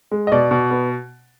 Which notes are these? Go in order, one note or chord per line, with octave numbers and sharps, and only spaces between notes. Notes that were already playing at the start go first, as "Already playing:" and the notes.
G#3
D#5
B2 D5
B2
B3